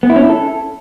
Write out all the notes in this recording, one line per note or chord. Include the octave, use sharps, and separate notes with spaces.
B3
E4
C#4
E4
A4